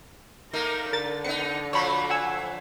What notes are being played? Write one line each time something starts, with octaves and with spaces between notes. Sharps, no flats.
A3 A#3 D#4 A#4
D3 A#4 A6
B3 D#4 C#7
F3 F#3 A3 C#5 B5
F#5 G#5 E6